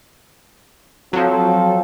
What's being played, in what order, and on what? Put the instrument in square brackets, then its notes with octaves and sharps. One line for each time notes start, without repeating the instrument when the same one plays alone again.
[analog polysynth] F3 F#3 [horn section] C4 F4 A4